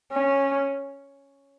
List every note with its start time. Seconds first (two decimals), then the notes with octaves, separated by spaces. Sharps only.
0.12 C#4